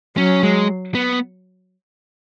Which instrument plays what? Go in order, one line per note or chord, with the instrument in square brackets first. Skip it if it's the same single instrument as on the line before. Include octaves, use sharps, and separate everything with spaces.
[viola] F#3 [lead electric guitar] C#4
[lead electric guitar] G#3
B3